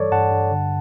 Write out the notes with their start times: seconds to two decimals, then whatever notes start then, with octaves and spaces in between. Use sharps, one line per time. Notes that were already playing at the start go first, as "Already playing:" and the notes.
Already playing: G2 E3 G3 A4 C#5 D5
0.12 G2 F#5 A5
0.31 G2
0.51 D3